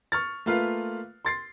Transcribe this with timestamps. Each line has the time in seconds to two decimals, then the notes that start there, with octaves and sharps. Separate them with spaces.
0.12 C#6 F6 A6
0.46 A3 A#3 F4 B4 F5
1.25 C6 A6 C7